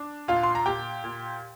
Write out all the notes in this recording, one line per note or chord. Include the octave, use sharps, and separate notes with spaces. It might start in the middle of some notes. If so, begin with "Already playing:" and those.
Already playing: D4
A#2 F4 F5
C6
A#5
A#2 G4 G5
A#2